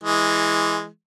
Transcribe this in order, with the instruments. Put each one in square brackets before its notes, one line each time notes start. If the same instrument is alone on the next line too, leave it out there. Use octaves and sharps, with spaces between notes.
[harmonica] E3 G#3